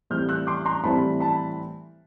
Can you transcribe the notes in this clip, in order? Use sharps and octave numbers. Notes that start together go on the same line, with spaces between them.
A2 E3 G3 C4 F6 G6
E6 F#6
C6 D6
A#5 C6
A2 E3 G3 C4 A5 B5
A5 B5